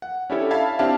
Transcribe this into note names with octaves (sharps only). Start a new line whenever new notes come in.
F#5
C#4 D4 E4 G4 A4 C#5
E5 F5 A5 B5 G#6
C4 D4 E4 G4 F5 A5